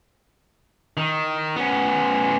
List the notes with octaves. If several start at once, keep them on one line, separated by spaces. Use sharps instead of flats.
D#3
B3 C#4